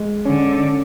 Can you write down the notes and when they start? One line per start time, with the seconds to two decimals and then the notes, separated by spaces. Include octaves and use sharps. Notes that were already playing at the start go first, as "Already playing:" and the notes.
Already playing: G#3
0.25 D3 C#4